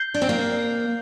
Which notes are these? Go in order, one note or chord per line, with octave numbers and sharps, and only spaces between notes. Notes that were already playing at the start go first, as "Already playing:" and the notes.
Already playing: G6 C7 G7
D4
C4
A#3